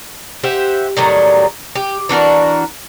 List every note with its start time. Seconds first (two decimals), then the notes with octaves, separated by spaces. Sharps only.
0.43 G4 C5 E5 F#5
0.97 A2 D#3 F#3 G3
1.75 G4
2.09 E3 D4 F#4 A#4